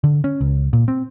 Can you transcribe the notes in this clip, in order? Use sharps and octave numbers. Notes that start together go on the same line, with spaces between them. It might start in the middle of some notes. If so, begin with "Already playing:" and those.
D3
C#4
C#2
A#2
C4